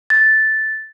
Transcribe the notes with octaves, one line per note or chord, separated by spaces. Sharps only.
A6